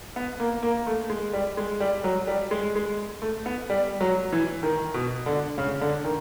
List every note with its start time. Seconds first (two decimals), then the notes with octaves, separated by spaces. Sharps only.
0.16 B3
0.40 A#3
0.63 A#3
0.87 A3
1.10 G#3
1.33 G3
1.57 G#3
1.80 G3
2.04 F#3
2.27 G3
2.51 G#3
2.75 G#3
3.22 A3
3.46 B3
3.70 G3
4.01 F#3
4.33 E3
4.63 D#3
4.94 B2
5.26 D3
5.58 C#3
5.81 D3
6.05 D#3